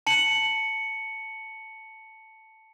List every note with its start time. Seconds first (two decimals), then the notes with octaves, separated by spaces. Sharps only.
0.07 A5 C#7 F#7